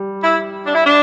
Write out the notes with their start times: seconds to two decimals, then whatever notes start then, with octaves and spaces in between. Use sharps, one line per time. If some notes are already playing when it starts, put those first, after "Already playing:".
Already playing: G3
0.23 E4
0.66 D4
0.75 E4
0.84 D4